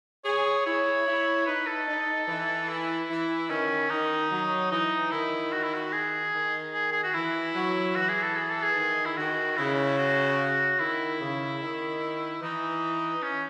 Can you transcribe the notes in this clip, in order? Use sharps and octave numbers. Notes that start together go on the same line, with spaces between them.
G#4 C#5
E4 C#5
E4
D#4 B4
A4
D#4
E3
E4
E3
D#3 C#4
D#3 D#4
F#3
E3 D#4
D#3 E4
F#4
E4
F#4
G#4
D#3
G#4
G#4
F#4
E3 E4
F#3
E3 F#4
G#4
A4
G#4
A4
G#4
D#3
E4
D#3 F#4
C#3 E4
F#4
D#3 E4
C#3
D#3
E3 D#4
C#4